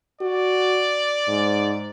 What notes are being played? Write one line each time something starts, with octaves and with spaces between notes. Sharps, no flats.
F#4 D5
G#2